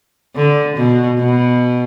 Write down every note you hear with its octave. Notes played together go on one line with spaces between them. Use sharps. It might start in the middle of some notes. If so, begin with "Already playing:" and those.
D3
B2
B2